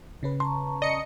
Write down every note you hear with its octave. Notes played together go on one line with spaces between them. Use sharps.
C#3 C#4 B4
A5 A#5 C6 C#6
D5 D#5 C#7